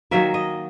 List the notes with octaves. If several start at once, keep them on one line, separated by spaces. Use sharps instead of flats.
D#3 F#3 A#3 E5
D#5